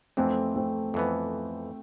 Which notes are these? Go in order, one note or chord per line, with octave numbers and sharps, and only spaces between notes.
F2 E3 A3 B3 C4
A3 C4
F2 E3 B3